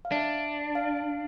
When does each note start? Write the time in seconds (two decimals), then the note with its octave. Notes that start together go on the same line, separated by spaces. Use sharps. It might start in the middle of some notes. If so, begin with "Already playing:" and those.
0.05 F5
0.11 D4 E5
0.75 F5
0.97 F5